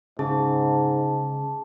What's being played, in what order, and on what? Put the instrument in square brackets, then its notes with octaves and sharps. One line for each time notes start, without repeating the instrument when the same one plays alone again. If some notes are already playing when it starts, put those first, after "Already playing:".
[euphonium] G#2 [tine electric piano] C#3 [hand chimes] G#4 [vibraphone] A5